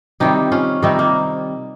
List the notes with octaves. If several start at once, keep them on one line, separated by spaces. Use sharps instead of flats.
C3 D#3 G3 D#4 G4
C#4 F4
C3 D#3 G3 C4 D#4
A#3